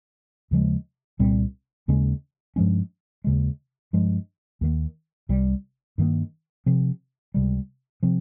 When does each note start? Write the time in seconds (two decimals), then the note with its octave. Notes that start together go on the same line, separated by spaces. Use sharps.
0.51 D#2 C#3 F3 G#3
1.19 C2 A#2 G3 C4
1.88 D#2 C#3 G#3 C#4
2.56 G2 F3 G#3 C#4
3.24 D#2 C#3 G#3
3.93 G2 F3 G#3
4.61 D#2 D#3 A#3
5.29 C2 C3 G3
5.98 G2 D#3 A#3
6.66 C3 F3 C4
7.34 C#2 C3 G3
8.03 C3 F3 C4